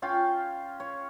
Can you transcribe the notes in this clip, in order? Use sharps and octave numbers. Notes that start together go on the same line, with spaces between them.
C#4 F4 F5 G5
C#5